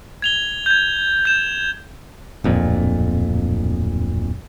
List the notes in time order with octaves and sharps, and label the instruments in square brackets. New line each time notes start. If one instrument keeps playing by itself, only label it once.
[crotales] G#6 F7 G7
G6 G#6
G6 E7
[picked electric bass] D1 F2 A#2